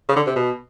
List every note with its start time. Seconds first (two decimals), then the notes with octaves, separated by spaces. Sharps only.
0.09 C#3
0.16 D3
0.27 C3
0.36 B2